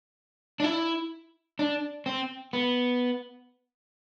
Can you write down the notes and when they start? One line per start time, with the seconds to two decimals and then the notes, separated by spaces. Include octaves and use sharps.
0.60 D4
0.64 E4
1.59 D4
2.06 C4
2.53 B3